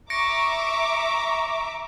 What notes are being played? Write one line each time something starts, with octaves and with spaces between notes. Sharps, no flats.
E5 A#5 C#6 D6 A#6 C#7 D7